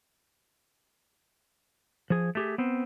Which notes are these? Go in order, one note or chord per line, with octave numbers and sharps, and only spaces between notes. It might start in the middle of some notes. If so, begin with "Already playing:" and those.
F3 G#4
A3 G4 G#4
B3 C4